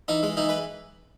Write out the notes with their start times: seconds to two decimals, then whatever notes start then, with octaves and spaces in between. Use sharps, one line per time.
0.08 E3 D#4
0.23 G#3
0.37 E3 D#4
0.49 B4